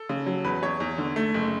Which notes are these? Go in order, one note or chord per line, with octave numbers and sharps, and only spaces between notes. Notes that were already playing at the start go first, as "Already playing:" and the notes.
Already playing: A4
C#3
F#3
E2 B4
E2 C#5
E2
D3
A3
F#1